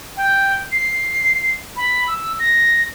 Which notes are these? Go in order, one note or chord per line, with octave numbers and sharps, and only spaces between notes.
G5
C7
B5
E6
A#6